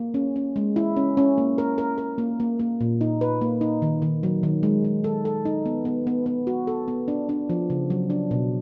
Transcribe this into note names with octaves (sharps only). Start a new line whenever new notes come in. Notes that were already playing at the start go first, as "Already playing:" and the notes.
Already playing: A#3
C#4
C#4
G#3
E4
C#4
C#4
A#3
A#4
A#4
A#4
A#3
A#3
A#3
A#2
D#4
B4
A#3
D#4
D#3
D#3
F#3
D#3
G#3
G#3
A4
A4
D#4
B3
B3
B3
B3
F#4
A4
B3
D4
D4
F3
C#3
F#3
D4
B2